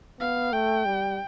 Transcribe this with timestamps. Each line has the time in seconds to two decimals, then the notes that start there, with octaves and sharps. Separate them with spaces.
0.20 B3 F5
0.52 A3 G5
0.86 G3